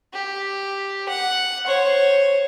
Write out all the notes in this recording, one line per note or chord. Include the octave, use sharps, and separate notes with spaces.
G4
F#5
C5 C#5